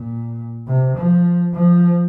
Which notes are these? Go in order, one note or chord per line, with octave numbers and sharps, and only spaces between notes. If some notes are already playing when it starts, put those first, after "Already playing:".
Already playing: A#2
C3
F3
F3